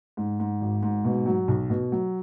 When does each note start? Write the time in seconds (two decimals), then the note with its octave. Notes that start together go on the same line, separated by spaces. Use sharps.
0.17 G#2
0.40 G#2
0.61 G#1
0.83 G#2
1.05 B2
1.26 F#3
1.48 B1
1.70 B2
1.92 F#3